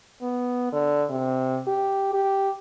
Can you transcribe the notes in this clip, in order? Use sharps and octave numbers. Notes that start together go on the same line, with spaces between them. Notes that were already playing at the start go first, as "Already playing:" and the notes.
B3
D3
C3
G4
G4